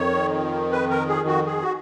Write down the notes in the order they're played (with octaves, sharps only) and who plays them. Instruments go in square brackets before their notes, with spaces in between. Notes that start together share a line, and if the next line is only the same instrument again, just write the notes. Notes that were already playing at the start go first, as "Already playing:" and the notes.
Already playing: [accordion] F2 D#3 C#5
B4
A#4
G#4
F#4
G#4
F#4